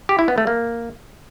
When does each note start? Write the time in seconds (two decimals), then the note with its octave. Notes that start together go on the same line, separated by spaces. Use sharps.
0.09 G4
0.19 E4
0.28 B3
0.38 A3
0.47 A#3